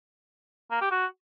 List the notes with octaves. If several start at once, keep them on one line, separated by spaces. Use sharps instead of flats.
A#3
G4
F#4